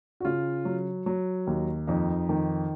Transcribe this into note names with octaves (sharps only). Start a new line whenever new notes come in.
F#4
C#3 F4
F#3
F#3
D#2
F2 D#4
D#3